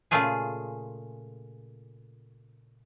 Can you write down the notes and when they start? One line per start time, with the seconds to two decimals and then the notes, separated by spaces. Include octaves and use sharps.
0.11 A#2 C#3 A3 F4 G#4